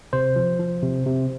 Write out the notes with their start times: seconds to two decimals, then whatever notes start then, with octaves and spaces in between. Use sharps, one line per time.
0.13 C3 C5
0.36 F3
0.59 F3
0.82 C3
1.06 C3